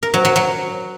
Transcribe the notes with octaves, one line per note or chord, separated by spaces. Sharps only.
A#4
F#3
F#3
F#3